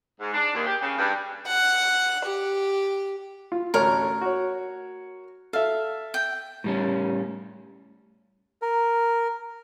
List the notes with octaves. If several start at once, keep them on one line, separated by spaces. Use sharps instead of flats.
G#2
D4
D#2
G4
C#3
G2
F#5
G4
F4
A1 D2 A#4 C#5
F#4 C#5
A4 E5 F5
G5
A2 G3 C#4
A#4